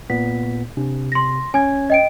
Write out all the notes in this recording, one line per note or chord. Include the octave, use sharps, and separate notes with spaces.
A#2 B3 B6
C3 D4
C6 A#6
C#4 G#5 G#6
D#5 G5 D7